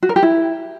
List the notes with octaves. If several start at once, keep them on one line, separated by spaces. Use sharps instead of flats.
F#4
A#4
G4
E4